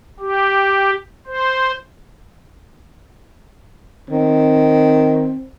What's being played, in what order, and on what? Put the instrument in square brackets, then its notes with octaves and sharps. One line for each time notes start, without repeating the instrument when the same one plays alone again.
[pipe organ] G4
C5
[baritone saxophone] D#3 [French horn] C4